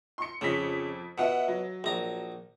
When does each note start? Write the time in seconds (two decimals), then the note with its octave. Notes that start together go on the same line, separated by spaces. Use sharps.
0.18 C6 C#7
0.41 F2 C#3 B6
1.18 B2 E5 F#5
1.48 F#3
1.84 A#1 A#5